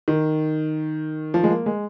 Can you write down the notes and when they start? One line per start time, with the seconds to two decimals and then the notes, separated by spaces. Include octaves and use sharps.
0.08 D#3
1.34 F3
1.43 G#3
1.50 A#3
1.66 G#3